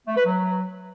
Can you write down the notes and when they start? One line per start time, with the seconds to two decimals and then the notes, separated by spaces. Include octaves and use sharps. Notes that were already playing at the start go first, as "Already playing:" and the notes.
0.07 A3
0.16 B4
0.25 F#3